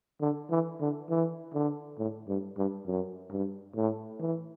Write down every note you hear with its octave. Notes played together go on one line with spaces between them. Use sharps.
D3
E3
D3
E3
D3
A2
G2
G2
F#2
G2
A2
E3